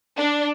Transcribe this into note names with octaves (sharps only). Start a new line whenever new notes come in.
D4